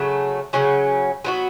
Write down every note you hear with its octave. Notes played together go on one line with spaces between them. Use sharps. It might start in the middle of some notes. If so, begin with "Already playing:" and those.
Already playing: C#3 F#3 A3
C#3 F#3 C#4
F#3 B3 F#4